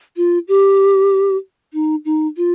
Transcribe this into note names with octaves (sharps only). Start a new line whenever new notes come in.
F4
G4
D#4
D#4
F4